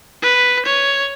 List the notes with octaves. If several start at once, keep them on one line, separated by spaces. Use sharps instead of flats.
B4
C#5